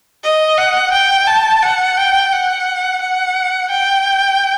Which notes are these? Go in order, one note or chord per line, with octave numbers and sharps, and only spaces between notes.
D#5
F#5
G5
A5
F#5
G5
F#5
F#5
G5